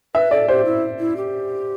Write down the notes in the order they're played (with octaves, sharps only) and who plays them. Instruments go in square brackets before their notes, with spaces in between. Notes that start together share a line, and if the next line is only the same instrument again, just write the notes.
[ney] B4 [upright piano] E5
[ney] A4 [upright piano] D5
[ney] G4 [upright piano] C5
[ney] E4
E4
G4